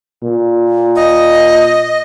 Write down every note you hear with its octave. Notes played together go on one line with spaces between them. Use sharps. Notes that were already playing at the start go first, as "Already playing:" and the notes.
A#2
D#5